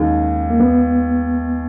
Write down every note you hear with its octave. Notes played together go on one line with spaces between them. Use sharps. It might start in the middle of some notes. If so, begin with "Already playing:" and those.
Already playing: D#2 D#3 G#3 C#4
A#3
B3